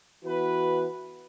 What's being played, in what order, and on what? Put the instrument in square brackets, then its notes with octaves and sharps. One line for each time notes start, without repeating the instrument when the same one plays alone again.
[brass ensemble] E3 B3 F#4 B4